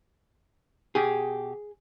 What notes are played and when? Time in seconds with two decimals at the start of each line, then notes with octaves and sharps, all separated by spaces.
0.95 B2 G4 G#4